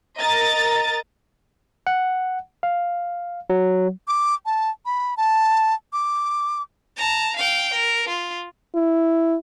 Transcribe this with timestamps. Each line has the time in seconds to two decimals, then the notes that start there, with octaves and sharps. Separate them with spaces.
0.20 A#4 D#5 A#5 A6
1.87 F#5
2.63 F5
3.50 F#3
4.08 D6
4.46 A5
4.86 B5
5.17 A5
5.93 D6
6.97 A5 A#5
7.36 F5 G5
7.73 A#4
8.09 F4
8.75 E4